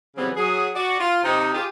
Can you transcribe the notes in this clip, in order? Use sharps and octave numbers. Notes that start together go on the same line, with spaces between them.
C#3 E3 F#3 G3 B3 C4
F#3 G#4
F#4 D5
F4
C3 D#4
F4 G4 G#4